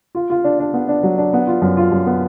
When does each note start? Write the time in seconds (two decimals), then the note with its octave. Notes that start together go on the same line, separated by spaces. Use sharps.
0.15 F4
0.30 F4
0.44 D4
0.59 D4
0.73 B3
0.89 D4
1.03 F#3
1.18 D4
1.33 B3
1.47 F4
1.62 F#2
1.77 F4
1.92 F#2
2.06 B3